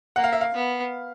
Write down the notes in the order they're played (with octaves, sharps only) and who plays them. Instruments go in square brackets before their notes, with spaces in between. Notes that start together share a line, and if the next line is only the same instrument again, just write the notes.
[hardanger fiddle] A#3 [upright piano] F#5
[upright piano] F5
E5
F5
[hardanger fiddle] B3